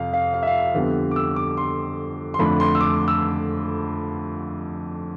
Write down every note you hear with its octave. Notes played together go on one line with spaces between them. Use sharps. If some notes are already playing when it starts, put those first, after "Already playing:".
Already playing: F2 C3 F3 F5
F5
F5
E5
F5
F2 D3 G3 B3
D6
E6
D6
C6
C6
F2 D3 A3 D4 B5
C6
E6
D6
E6